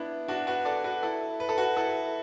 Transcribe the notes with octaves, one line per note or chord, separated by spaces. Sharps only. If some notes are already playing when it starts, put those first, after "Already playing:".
Already playing: B3 D4 E4
D4 F#4
F#4 B4
A4 D5
F#4 B4
E4 A4
B4
A4
F#4 B4
E4 A4